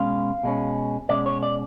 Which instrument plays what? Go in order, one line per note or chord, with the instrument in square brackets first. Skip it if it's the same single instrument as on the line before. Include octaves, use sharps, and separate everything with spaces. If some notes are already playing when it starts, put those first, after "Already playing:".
Already playing: [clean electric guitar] B2 G#3 C#4 F5
B2 G#3 C#4
B2 G#3 C#4 D5
C#5
D5